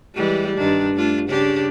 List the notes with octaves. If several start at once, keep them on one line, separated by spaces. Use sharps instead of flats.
E3 G3 G#3
G2 D#3 D4
A3 D4 F4
C#3 D4 G4